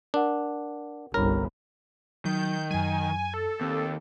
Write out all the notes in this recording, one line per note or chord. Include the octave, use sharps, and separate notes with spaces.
D4 A#4 F#5
G1 C2 A#4 C#5 A#5 B5
D#3 F#3 G6
F#2 F#3 G#5
A4
D#2 C4 A#4